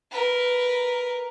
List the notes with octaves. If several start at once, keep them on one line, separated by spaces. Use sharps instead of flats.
A#4 B4